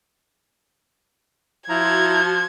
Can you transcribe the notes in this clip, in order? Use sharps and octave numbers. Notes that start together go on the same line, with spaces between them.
F3 E4 F#4 A5 A#5 C6 G#6